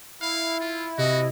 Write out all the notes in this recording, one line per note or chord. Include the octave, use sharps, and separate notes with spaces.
E4 F5
F4
C3 F#4 D#5